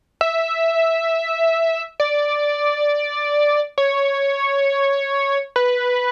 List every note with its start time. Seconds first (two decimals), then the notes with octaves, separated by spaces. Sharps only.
0.21 E5
2.00 D5
3.78 C#5
5.56 B4